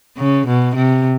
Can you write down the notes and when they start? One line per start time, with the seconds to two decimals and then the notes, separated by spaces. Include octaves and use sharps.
0.17 C#3
0.47 B2
0.75 C3